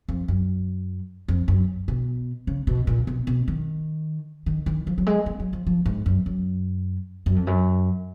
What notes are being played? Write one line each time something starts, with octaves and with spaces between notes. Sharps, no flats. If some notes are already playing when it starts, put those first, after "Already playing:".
F2
F#2
F2
F#2
B2
C#3
B2
A#2
B2
B2
D#3
D#3
D#3
F3
F#3
G#3
A#3
F#3
F3
F3
G#2
F#2
F#2
F#2
F2
F#2